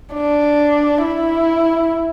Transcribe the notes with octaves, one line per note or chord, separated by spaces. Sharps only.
D4
E4